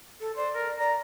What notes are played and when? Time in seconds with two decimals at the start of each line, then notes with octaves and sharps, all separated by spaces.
0.20 A4
0.36 C5 D5
0.55 A#4
0.79 D5 A#5